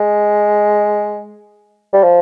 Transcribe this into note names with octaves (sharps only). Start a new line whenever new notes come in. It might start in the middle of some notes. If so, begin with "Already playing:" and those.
Already playing: G#3
G3
F3